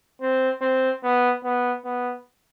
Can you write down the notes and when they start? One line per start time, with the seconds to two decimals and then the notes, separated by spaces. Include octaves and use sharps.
0.21 C4
0.62 C4
1.03 B3
1.44 B3
1.85 B3